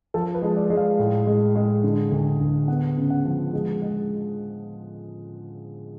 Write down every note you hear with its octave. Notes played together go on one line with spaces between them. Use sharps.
F3 A4
B4
G#3
D5
G#3
F5
A2
G#3
G#3
D3
D2
D2
B3 F#5
C#3
F#5
F3
G#3
G#3